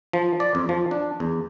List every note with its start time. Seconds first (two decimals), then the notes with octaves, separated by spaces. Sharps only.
0.13 F3
0.40 D5
0.55 F2
0.69 F3
0.91 D4
1.20 E2